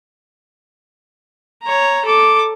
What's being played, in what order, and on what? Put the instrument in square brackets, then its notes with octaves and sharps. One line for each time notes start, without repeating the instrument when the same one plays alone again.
[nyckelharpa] C#5 A#5
A4 D6